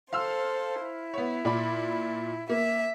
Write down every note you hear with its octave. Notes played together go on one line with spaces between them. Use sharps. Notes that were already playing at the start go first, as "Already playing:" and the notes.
A4 C5 F5 C6 E6
E4
B3 C#5
A#2 D5 B5
A#3 E5